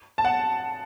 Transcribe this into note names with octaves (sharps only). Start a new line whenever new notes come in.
A5
F#5